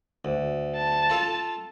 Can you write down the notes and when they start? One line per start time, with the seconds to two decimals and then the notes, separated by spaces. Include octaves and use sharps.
0.25 D2
0.77 A5
1.10 F4 A4 F5